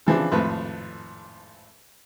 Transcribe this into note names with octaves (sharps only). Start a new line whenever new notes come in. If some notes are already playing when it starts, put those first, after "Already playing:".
C#3 E3 F3 C4 D4
G#1 F2 A2 B4